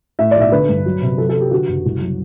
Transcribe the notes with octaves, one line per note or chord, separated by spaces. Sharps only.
A2 E5
D5
B1 E5
D3 B4
G2
F#3
C3
F#3 A4
A4
F#3
G4
D3 F#4
F#1
C2
F#3